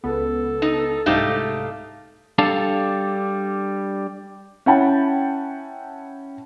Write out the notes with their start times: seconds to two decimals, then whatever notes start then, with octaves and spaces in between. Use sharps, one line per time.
0.04 C#2 B3 A4
0.62 D#4
1.06 C2 G#2 A3 D#4 G4 F5
2.38 G3 D4 A4 F5
4.66 C#4 E4 F#5 G5 A5 B5